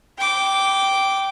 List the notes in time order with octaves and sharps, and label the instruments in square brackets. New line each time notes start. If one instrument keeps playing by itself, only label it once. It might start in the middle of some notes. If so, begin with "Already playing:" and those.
[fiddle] G5 D6